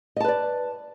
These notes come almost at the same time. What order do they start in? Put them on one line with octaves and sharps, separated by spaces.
D#5 A5 B4 D5